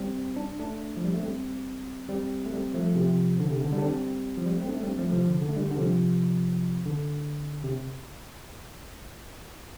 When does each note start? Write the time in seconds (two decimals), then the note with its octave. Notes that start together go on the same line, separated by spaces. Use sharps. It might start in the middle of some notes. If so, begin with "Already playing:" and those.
Already playing: G3 C4
0.36 D4
0.59 A3 D4
0.97 F3
1.04 G3
1.14 A3
1.22 G3 C4
2.09 G3 C4
2.45 A3
2.53 G3 C4
2.74 F3 A3
2.95 C3 F3
3.40 D3
3.50 C3
3.61 D3
3.72 D3 G3
3.78 D4
3.82 G3 C4
4.38 F3
4.46 G3
4.53 A3
4.62 C4
4.69 A3 D4
4.83 G3 C4
4.98 F3 A3
5.12 C3 F3
5.28 D3
5.42 D3
5.49 A3
5.56 D3 G3
5.71 D3
5.78 C3 F3
6.85 D3
7.64 C3